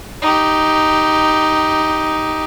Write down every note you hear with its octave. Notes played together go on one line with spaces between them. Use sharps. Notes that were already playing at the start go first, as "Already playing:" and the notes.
D#4 G4